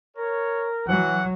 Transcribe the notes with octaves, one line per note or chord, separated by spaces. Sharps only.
A#4 C#5
E3 F#3 F#5